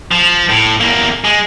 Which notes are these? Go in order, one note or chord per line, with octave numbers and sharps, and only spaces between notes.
F3
A2
E2 A#3
G#3